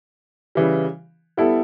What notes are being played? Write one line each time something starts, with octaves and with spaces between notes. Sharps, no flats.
C#3 E3 G3
G3 B3 E4 A4